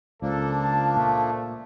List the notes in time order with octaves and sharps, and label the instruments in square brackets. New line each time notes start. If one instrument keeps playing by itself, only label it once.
[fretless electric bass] C#2 [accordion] F3 A#3 D4 [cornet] A4
[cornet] A5
[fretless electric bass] A#2 [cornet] A3